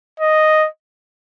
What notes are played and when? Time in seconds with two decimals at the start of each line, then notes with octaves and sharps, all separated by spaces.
0.20 D#5